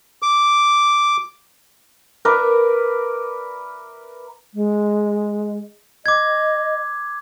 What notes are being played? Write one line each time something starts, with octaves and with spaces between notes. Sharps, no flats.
D6
A#4 B4 D5 E5
G#3
D#5 D6 G#6